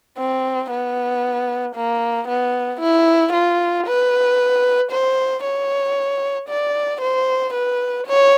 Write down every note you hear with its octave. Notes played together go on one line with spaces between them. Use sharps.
C4
B3
A#3
B3
E4
F4
B4
C5
C#5
D5
C5
B4
C#5